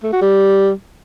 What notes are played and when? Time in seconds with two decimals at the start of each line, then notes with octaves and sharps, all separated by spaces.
0.03 A3
0.12 F#4
0.22 G3